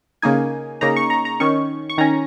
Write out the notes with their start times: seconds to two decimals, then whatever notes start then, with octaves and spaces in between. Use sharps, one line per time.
0.22 C#3 A#3 D#4 G#5
0.81 C#3 A#3 D#4 A#5
0.96 C#6
1.10 A#5
1.25 A#5
1.40 D#3 C#4 C#6
1.90 C#6
1.98 D#3 C#4 A#5